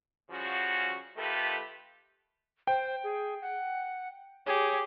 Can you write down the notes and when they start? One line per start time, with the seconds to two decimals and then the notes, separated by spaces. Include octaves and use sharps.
0.30 C#3 F3 G3 C#4 F#4
1.17 D#3 A3 F4 G4 A4 B4
2.67 C5 G5
3.04 G#4
3.42 F#5
4.46 G4 G#4 C#5